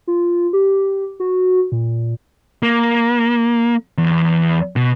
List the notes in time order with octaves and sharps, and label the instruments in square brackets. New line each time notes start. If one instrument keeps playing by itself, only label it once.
[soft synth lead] F4
G4
F#4
A#2
[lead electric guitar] A#3
E2
B2